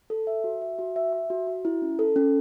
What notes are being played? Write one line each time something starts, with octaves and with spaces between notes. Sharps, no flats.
A4
E5
F#4
E5
F#4
E5
E5
F#4
F#4
E4
C#4
A4
C#4